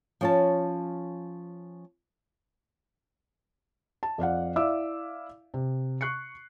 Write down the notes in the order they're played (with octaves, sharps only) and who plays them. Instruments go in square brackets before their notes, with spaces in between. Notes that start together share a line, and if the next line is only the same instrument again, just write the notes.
[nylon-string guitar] F3 C#4 C#5 F5 A5
[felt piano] A5
F2 D5 F5 F#5
E4 D5 E5 F5 D6 E6
C3
C#6 F#6 C7 C#7